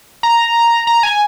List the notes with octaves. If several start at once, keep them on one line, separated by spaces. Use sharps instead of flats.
A#5
A#5
G#5